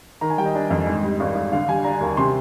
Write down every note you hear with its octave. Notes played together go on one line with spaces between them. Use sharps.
D#3 A#5
G#5
G3 G5
D#5
D4
F2
G#2
G3
G#1
G#1
D3 F5
G3 G#5
D4 A#5
D#2
C3 C6